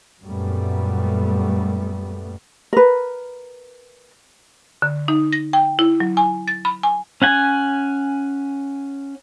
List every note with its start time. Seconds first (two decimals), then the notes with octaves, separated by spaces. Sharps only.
0.24 F#2 A#2 G3 A3 B3
2.73 A#4 B4
4.82 D3
5.08 D#4
5.33 A#6
5.53 G5
5.79 E4
6.00 F#3
6.17 G#5
6.48 A6
6.65 B5
6.83 G#5
7.22 C#4 F#5 G#5